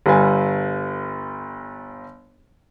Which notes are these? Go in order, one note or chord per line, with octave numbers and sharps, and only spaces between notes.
G1 G3 B4 F5 G#5